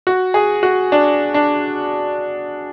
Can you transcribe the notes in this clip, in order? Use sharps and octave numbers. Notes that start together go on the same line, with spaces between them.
F#4
G#4
F#4
D4
D4